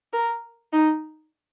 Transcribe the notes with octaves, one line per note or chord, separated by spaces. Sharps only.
A#4
D#4